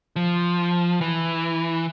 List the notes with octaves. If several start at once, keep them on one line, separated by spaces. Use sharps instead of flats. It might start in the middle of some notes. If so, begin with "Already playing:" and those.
F3
E3